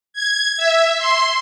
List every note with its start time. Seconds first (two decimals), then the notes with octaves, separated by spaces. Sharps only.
0.13 G#6
0.57 E5
0.99 C6